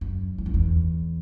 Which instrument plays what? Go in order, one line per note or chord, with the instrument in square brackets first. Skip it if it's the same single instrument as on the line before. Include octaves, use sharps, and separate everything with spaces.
[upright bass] F#2
E2
F#2
E2